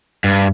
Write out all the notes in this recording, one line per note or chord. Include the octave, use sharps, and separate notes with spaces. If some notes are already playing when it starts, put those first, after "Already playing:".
G2